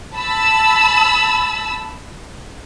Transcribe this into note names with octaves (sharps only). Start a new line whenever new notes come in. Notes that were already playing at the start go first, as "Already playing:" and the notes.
A5 B5 E6